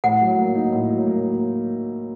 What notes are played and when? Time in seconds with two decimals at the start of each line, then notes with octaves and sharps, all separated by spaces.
0.04 A2 F#5
0.21 F#3
0.38 A#3
0.55 D#4
0.72 A2
0.89 F#3
1.06 A#3